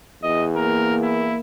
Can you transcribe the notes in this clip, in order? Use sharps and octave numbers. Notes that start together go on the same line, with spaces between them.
E2 D#5
A#3 A#4
E4